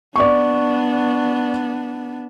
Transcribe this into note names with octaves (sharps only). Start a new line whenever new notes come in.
B3 D4 D5 C#6